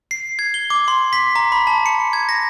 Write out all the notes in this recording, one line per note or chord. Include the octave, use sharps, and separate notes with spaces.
C7
G#6
G7
D6
C6
B6
A#5
B5
A5
C#7
G#6
A#6